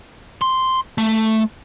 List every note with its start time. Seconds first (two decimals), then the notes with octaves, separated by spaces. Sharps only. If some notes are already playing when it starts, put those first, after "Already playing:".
0.42 C6
0.98 A3